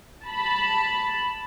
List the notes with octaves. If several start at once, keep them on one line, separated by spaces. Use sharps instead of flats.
A5 B5